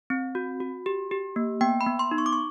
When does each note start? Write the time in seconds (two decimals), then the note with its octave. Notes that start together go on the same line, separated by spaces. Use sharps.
0.10 C4
0.35 F#4
0.60 F#4
0.86 G4
1.11 G4
1.36 A#3
1.61 B3 G5
1.81 B5
1.86 B3
1.99 C6
2.11 D#4
2.18 C#6
2.26 D6
2.33 C#6